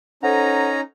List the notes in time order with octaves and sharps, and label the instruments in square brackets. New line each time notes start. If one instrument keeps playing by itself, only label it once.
[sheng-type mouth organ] C#4 D#4 A#5 [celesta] A4 C5 F#5